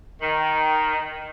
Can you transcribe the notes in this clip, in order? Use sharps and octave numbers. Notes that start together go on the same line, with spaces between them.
D#3